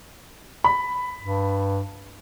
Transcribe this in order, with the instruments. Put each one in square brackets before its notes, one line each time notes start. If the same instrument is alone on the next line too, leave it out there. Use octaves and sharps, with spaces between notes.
[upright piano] B5
[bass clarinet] G2